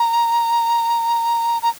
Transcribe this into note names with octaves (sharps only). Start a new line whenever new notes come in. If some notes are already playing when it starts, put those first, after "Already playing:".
Already playing: A#5
A#5